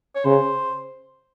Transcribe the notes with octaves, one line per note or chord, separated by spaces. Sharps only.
C#5
C#3 C5